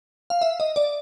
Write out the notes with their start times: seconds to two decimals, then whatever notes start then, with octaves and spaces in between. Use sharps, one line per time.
0.30 F5
0.41 E5
0.60 D#5
0.76 D5